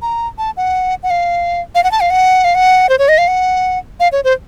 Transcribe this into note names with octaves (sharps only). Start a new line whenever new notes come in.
A#5
A5
F#5
F#5
F5
F5
F#5
A5
F5
F#5
F5
F#5
C5
C#5
D#5
F5
F#5
F5
C#5
C5